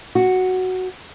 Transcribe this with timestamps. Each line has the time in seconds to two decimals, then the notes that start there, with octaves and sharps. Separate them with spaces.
0.15 F#4